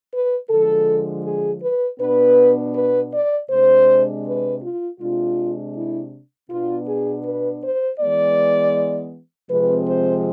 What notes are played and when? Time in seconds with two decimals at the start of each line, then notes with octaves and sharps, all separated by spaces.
0.12 B4
0.50 D3 F3 G#3 A4
1.24 G#4
1.62 B4
2.00 B2 B3 D4 B4
2.75 B4
3.13 D5
3.50 C3 G#3 D4 C5
4.25 B4
4.63 F4
5.00 C3 G#3 D4 F4
5.75 E4
6.50 B2 B3 D4 F4
6.88 G#4
7.25 B4
7.63 C5
8.00 E3 G#3 B3 D5
9.50 C3 F3 G#3 C4 B4
9.88 C5